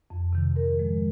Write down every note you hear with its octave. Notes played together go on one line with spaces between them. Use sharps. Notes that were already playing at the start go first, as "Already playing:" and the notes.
F2
C3 D#3
G#2 A#4
F3 G#3